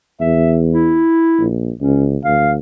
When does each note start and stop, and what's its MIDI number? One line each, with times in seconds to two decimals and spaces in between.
0.20 1.01 40
0.20 0.56 76
0.69 1.46 64
1.39 1.71 34
1.81 2.17 37
1.81 2.08 61
2.24 2.59 38
2.24 2.52 77